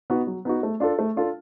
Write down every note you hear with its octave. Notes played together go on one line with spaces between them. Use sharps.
B3 D#4 F#4
F#3
B3 D#4 F#4
A3
D4 F4 A4
A3
D4 F4 A4